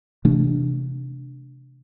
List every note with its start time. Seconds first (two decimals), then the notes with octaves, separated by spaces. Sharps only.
0.25 C3 E3 A3 D4